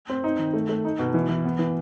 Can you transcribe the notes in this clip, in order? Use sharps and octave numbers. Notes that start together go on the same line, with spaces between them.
C4
D#4
D#3
A3
A3
D#4
B2
E3
E3
B3
E3